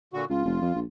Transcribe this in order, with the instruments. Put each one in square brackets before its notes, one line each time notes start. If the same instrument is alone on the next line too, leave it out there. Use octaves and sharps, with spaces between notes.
[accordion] A#2 D3 F#4
[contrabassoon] C#2 [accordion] F4
[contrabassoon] F1
F2
A#1